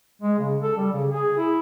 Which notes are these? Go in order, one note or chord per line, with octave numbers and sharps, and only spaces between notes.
G#3
C#3
A4
G3
C#3
G#4
E4